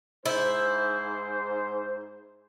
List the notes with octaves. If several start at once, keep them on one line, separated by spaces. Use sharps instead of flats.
G#2 E4 C5